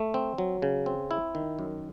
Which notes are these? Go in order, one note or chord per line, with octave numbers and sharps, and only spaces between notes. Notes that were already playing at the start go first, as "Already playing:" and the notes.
Already playing: A3
C4
F#3
C#3
C4
E4
D#3
F#2